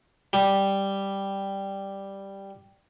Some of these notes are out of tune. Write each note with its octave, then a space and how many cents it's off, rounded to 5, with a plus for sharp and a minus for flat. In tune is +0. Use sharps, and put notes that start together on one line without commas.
G3 +0